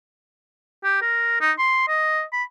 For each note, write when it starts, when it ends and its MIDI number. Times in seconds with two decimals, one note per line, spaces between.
0.84 0.98 67
1.01 1.37 70
1.41 1.52 63
1.58 1.87 84
1.88 2.22 75
2.32 2.43 83